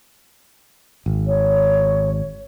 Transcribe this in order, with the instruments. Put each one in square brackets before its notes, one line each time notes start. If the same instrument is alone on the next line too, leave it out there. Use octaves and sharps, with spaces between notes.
[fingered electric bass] G#1
[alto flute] C#5